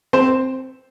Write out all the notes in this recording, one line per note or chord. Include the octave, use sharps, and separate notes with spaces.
C4 C5